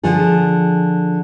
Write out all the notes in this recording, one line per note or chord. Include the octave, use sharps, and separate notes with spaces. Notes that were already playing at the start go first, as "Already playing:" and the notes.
D3 F3 F4 G#4